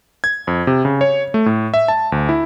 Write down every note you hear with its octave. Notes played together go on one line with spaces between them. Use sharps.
G#6
F2
C3
C#3
C#5
A3
A2
E5
A5
D2
E4